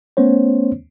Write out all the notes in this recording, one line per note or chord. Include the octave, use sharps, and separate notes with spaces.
A3 B3 C#4 C5 C#5